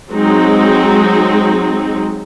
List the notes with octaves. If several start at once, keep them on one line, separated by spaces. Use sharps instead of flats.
F#3 G#3 C4 D#4